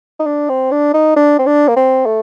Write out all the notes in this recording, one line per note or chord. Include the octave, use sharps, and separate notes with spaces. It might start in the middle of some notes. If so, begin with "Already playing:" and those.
D#4
D4
C4
D4
D#4
D4
C4
D4
A#3
C4
A3